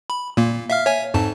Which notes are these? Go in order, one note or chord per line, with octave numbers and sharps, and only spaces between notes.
B5
A#2 A#3
E5 F5 F6
C#5 E5 G#5
F2 G#2 A5